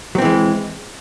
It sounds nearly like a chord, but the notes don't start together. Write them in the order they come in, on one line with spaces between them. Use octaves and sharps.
F#3 C4 E3 G#3